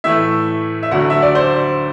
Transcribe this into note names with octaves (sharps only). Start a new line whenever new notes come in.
A2 E3 A3 E5
E5
D2 D3 F#3 A3 F#5
E5
D5
C5